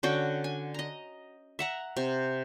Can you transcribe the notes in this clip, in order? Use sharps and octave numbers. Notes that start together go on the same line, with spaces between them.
D3 C#4 F#4 G5
G#5
D#5 A#5
E5 F#5 A#5
C3